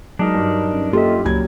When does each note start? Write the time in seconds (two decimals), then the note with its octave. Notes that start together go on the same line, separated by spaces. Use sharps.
0.19 F#3 G#3 D4 D#4 A#4
0.35 G2
0.73 C#4
0.93 A#3 F4 G4 A4 D#5 E5
1.25 C#2 A#2 F#3 E4 G#6